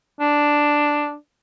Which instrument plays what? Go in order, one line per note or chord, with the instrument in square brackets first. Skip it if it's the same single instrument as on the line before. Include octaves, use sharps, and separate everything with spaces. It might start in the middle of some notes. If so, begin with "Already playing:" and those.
[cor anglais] D4